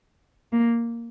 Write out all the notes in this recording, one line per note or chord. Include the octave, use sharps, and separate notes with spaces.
A#3